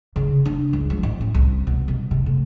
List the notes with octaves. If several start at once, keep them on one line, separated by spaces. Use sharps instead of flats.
C#3
D4
C#2
F3
A1
C#4
C2
B2
C2
C3
A2